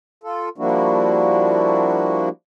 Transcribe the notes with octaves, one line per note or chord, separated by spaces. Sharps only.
F4 A4
F3 G3 A#3 D4 E4 F#4